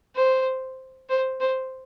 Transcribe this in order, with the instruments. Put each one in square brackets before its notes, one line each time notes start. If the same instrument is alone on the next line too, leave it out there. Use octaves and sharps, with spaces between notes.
[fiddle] C5
C5
C5